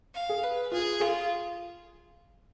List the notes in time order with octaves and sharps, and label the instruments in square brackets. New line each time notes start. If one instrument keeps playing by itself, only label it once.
[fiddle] F5
[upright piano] G#4
[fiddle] B4
[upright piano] F4 [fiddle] G#4
[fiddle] F4 [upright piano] G#4